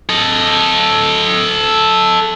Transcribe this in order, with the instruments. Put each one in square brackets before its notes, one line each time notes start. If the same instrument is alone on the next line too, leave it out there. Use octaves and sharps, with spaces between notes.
[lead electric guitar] A4 D#5